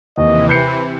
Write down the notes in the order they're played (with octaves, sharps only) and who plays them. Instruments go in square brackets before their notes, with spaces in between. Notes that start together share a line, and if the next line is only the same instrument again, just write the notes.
[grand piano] D#2 [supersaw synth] C3 E3 [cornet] D#5
[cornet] B4 [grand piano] G6 C7 C#7